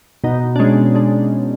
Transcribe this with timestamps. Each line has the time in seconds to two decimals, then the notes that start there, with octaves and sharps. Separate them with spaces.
0.24 B2 D#4
0.56 D4
0.59 G#3 C#4
0.95 G#3 D4